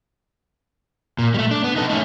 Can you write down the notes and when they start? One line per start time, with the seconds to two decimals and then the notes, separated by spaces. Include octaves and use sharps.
1.19 A#2
1.34 G3 A3
1.51 D4
1.64 B3
1.76 D#4 A4
1.89 A3 C#4